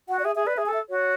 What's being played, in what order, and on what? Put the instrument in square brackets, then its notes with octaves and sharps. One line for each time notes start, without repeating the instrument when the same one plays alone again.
[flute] F#4 [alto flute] F#5
[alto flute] D5
[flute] G#4 [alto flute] E5
[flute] G#4 [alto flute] E5
[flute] B4 [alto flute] D5
[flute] G#4 [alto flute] E5
[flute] A4 [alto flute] G#5
[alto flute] E5
[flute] F#4 [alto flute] C#5